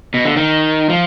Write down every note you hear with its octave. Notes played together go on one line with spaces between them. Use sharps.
B2
D3
D#3
F3